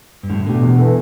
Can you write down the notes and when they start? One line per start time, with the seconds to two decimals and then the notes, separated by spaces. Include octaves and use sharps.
0.23 G2
0.29 A2 D3
0.46 B2 A3 D4 G4
0.62 E2
0.78 E3 B3 E4 A4